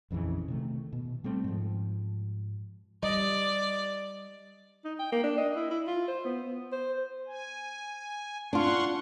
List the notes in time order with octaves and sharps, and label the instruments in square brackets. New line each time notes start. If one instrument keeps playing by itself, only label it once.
[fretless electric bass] A#1 F2 C#3 E3
C3 D#3 A3
B2
G3 A3 C4
G#2 F3
[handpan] G3 D#5 [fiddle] D5
[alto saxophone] D#4
G5
A#3
D4
D#5
E4
E4
F4
C5
B3
C5
[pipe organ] G#5
[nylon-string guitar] D4 F4 [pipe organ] F#5 C6 C#6